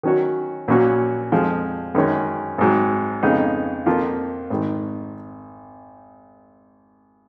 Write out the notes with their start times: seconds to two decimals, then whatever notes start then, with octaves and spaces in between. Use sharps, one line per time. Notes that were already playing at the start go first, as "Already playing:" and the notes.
0.03 D#3 F#3 C#4 F#4 C#5
0.68 A#1 A#2 F#3 C#4 F#4
1.32 F2 F3 G#3
1.95 F#2 D#3 G#3 C#4
2.58 G#1 G#2 F#3
3.22 F2 C#3 G#3 B3 D#4
3.86 F2 F3 A#3 F4 A#4
4.50 G#1 G#2 D#3